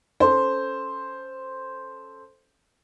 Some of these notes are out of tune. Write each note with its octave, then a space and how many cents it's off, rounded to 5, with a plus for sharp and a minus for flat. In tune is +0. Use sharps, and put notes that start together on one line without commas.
C#4 +0 A4 +0 C5 +0